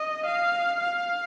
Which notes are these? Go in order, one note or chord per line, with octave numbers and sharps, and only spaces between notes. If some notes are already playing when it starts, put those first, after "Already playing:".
Already playing: D#5
F5
F5